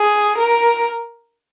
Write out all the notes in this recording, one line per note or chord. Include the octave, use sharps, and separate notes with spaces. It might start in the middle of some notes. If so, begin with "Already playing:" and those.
Already playing: G#4
A#4